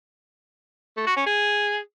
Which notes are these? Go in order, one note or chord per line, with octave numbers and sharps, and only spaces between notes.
A3
F#4
C#4
G#4